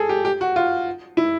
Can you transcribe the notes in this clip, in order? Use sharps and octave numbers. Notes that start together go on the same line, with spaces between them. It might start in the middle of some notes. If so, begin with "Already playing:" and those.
Already playing: G#4 A4
G4
G4
F#4
F4
E4